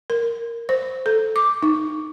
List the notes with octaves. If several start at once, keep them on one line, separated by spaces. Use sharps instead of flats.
A#4
C5
A4
D6
D#4